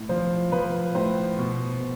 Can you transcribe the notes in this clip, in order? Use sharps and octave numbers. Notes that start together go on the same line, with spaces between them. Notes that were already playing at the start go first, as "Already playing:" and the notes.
Already playing: A2
F3 C5
F3 B4
A2 C5
B2
B2